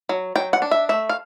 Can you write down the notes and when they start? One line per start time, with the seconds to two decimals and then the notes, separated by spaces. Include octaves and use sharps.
0.09 F#3
0.35 F#3 G5
0.53 F#5
0.62 D4
0.71 E5
0.89 A3 E5
1.09 F5